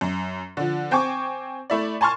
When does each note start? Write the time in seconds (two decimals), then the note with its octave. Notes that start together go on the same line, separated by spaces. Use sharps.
0.01 F#2
0.57 D3 F3
0.91 C4 G5 G#5 C#6 D6
1.70 A3 E4 D5
2.01 G#5 A5 C6 C#6 F6 A6